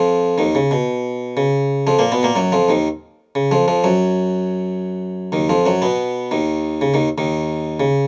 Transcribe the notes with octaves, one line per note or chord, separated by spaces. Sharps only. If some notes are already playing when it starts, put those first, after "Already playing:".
Already playing: F2 F3
D#2 D#3
C#3
B2
C#3
F2 F3
A#2 A#3
B2 B3
A#2 A#3
F#2 F#3
F2 F3
D#2 D#3
C#3
F2 F3
F2 F3
F#2 F#3
D#2 D#3
F2 F3
F#2 F#3
B2 B3
D#2 D#3
C#3
D#2 D#3
D#2 D#3
C#3